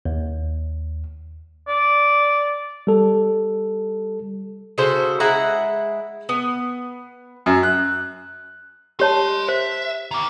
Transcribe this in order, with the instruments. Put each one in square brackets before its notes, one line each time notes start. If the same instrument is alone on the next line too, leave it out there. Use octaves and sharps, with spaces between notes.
[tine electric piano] D#2
[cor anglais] D5
[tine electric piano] G3 A4
[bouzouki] C#3 F#4 A4 C5
G#3 E4 F#5 A#5
B3
[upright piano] F#2
F#6
[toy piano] G4 C#5 A5 [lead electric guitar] D#5 C6
[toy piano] C5 [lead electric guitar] E5
[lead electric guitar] D#3 A#3